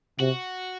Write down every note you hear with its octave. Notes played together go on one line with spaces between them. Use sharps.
C3 F#4